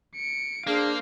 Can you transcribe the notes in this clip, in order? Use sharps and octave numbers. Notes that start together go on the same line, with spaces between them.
C#7 D7
A#3 D4 G#4 C5 F5